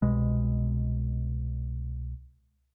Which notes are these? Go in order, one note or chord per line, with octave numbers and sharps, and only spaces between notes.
C2 B2 G#3